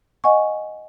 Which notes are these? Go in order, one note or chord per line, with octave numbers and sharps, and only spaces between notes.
D#5 F#5 G#5 C#6